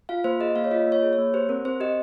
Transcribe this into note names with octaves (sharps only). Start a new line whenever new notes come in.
F4 F5
A#3 C5
G#4 D#5
A#3 F5
C#5
F4 D#5
A#3 C#5
G#4
C#5
A#3
G4 C5
C4 A#4
C4 C5
G4 D#5